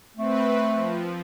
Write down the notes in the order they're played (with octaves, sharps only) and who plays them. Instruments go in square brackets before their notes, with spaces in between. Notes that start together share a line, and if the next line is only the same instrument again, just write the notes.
[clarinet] A3 [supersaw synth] C4 B4
[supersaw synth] F3